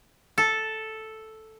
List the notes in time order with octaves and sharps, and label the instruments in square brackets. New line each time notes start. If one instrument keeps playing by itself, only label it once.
[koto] A4